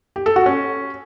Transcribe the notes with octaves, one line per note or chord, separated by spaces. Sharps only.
G4
A4
F#4
C#4